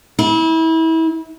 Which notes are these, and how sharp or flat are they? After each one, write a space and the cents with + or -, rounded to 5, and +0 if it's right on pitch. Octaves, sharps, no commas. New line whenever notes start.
E4 -30